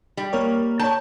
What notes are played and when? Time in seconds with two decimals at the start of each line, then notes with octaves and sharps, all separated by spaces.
0.17 G3
0.33 A#3 A#4 C#5
0.79 C#5 A5 G6